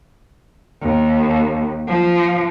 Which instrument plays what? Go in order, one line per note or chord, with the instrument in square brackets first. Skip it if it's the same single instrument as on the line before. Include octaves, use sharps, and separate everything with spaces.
[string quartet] D#2
F3